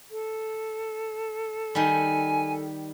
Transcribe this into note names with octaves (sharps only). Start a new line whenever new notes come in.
A4
D#3 G3 G#5